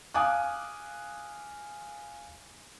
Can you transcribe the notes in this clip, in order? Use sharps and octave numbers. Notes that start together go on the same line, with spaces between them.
F5 G#5 D6 D#6 F#6